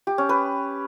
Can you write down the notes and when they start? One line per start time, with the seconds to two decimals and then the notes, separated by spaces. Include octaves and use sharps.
0.07 G4
0.18 C#4
0.29 B4